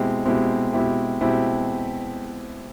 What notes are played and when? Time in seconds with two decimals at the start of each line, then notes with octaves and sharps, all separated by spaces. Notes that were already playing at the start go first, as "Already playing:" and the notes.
Already playing: B2 G#3 C4 E4 G4
0.25 B2 G#3 C4 E4 G4
0.73 B2 G#3 C4 E4 G4
1.21 B2 G#3 C4 E4 G4